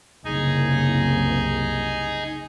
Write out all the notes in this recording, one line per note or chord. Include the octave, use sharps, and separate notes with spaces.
F#1 C2 D#4 G#4 G#5